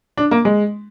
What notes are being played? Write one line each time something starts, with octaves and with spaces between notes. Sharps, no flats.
D4
A#3
G#3